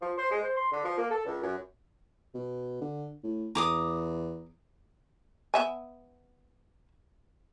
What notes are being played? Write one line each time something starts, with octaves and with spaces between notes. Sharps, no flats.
F3
C5
G#3
C5
C6
D3
F3
A#3
A4
C#2
F#2
B2
D3
A2
E2 A#5 D6 D#6
B3 E5 G#5